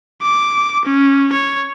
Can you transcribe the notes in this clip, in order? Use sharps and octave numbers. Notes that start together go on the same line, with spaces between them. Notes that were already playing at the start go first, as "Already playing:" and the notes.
D6
C#4
C#5